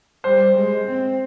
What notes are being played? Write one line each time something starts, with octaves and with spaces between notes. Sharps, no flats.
G3 C5
G#3
C4